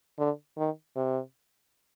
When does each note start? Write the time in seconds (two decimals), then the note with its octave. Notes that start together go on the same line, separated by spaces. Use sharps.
0.18 D3
0.57 D#3
0.96 C3